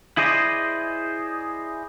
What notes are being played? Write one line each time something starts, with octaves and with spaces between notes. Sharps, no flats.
E4 G#4 C5 D5 D#5